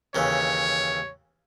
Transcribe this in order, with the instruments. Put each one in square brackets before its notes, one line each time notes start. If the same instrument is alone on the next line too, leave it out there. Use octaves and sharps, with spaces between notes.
[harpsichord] D#2 C#3 E3 [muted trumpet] C#5